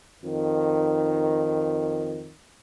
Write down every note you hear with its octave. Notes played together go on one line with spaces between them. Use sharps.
F2 D#3